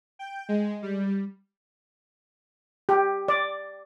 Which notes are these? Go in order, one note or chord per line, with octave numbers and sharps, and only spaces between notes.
G5
G#3
G3
G4
D5